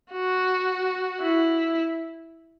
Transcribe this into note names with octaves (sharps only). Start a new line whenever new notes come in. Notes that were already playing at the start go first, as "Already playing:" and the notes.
F#4
E4